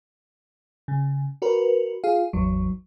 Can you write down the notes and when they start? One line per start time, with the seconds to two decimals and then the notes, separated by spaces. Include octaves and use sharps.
0.88 C#3
1.42 F#4 A#4 B4
2.04 F4 G#4 F5
2.33 G#1 E2 F#3